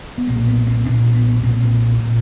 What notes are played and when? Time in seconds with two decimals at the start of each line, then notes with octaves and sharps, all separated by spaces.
0.18 B3
0.27 B1 A#2 A#3
0.47 B3
0.67 C4
0.86 B1 A#2 D4
1.15 B3
1.43 B1 A#2 C4
2.00 A#2